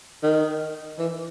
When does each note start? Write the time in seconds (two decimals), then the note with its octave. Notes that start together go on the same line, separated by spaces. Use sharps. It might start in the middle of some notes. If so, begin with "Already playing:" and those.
0.23 D#3
0.99 E3